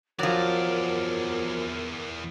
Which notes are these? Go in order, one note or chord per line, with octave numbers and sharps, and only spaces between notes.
E2 F3 F#3 A#4 D5